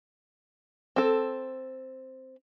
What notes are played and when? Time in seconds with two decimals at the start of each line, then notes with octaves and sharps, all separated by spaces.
0.96 C4 A4